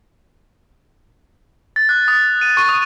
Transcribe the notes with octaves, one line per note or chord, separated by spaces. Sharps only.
A6
F#6
D#6
D#7
C#6
D#6